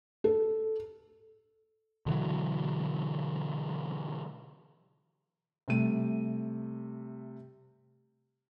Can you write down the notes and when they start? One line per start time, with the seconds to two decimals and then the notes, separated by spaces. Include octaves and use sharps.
0.24 A4
2.06 B2 D3 E3 F#3
5.68 C3 G3 A3 D#7